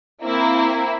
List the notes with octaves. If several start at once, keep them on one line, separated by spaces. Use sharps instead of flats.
A#3 C4 E4